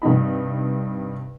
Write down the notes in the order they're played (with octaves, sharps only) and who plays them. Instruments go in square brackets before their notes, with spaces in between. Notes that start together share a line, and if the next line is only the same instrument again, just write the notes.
[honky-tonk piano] G2 C3 D#4 B5